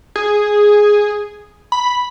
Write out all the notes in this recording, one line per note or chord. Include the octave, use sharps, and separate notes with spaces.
G#4
B5